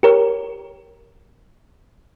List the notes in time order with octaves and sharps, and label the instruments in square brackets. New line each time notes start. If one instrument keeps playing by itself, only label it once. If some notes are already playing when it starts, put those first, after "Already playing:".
[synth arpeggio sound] G4 A#4 C#5